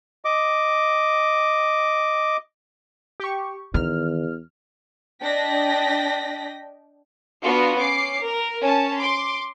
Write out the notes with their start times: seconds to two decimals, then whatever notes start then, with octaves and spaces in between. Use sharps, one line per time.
0.25 D#5 D6
3.20 G4 C#6
3.74 E2 D#3 F6
5.23 D4 D#5 G5 A#6 B6
7.43 B3 D4 F4 F#4
7.78 C#4 D6 C7
8.22 A#4
8.60 C#4 A5
8.97 C6 D6